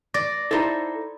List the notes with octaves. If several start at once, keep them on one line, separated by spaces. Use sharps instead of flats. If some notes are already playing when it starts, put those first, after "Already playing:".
D5 A#6
D#4 E4 A4 C5